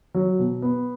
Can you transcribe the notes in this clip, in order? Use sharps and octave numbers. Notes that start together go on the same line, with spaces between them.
F#3
B2
B3